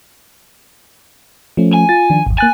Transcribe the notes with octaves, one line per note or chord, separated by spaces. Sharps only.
F3 A3 C#4
G#5
F4 A6
D#3 F3 D4
G#1 E2
A#3 G#5 F#6 A6